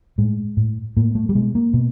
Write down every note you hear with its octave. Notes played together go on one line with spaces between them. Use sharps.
A2 G#3
A2
A2 A#3
A3
G3
B2 G#3
A#3
B2